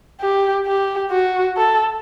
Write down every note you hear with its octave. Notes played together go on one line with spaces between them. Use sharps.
G4
G4
F#4
A4